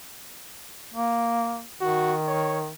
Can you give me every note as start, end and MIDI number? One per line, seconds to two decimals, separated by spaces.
0.94 1.62 58
1.81 2.71 51
1.81 2.14 66
2.27 2.58 73